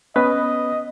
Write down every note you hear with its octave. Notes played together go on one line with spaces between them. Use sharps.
B3 C#4 B4 D#5